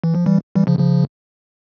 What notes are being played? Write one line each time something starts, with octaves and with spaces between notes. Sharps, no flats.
E3
F3
E3 G3
E3 G3
C#3 F3
C#3 F3